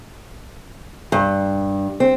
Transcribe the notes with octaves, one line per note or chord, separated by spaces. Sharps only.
G2
C4